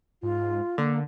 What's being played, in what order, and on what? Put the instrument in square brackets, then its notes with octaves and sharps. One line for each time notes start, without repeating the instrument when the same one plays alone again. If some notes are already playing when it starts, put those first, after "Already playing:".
[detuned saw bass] G#2 [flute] F4
[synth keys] D3 [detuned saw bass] A#3